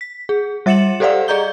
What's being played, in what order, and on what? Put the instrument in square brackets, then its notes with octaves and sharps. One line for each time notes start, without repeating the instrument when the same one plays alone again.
[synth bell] B6
G#4
G3 E5 A6 C#7 E7 F#7
G4 A4 C5 D5 F5 F#5
G#4 D5 D#5 A#5 G6 G7